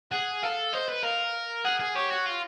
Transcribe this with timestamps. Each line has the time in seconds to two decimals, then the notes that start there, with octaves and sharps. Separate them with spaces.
0.11 G#4 F#5
0.43 A4 F5
0.73 C5 D#5
0.89 B4
1.03 A#4 F5
1.65 G#4 F#5
1.80 G#4
1.95 G4 C#5
2.11 F#4
2.26 F4